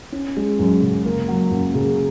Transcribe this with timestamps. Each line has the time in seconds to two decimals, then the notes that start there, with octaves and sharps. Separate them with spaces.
0.12 C#4
0.37 G#3
0.59 F#2
0.82 C#3
1.05 A#3
1.28 F#3
1.51 F#2
1.75 C#3